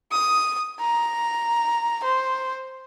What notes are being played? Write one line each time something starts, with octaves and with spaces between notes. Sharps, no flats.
D#6
A#5
C5